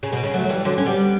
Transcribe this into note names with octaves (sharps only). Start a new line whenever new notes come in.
C#3
B2
C#3
F#3 A3
F#3
E3 G3
D3 F#3
C#4
G3 B3